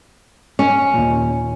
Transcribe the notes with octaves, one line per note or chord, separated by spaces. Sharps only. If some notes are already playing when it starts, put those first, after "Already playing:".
C#4
D#2 A#2